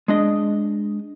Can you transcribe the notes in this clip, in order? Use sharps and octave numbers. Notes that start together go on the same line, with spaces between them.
G#3 D4 D#5